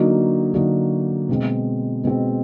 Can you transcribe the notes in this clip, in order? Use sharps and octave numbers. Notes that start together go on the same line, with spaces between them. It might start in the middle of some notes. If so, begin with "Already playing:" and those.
Already playing: D3 F#3 A#3 D#4 F#4
D3 F#3 A#3 D#4 F#4
B2 G#3 C4
B2 G#3 C4